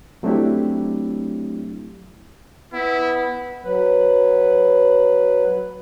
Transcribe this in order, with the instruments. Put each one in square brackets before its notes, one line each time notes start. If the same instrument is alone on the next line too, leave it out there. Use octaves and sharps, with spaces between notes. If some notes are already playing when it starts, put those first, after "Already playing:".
[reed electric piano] F#3 A3 C4 D4 E4 G4
[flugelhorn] B3 [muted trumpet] E4
[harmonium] F#3 B4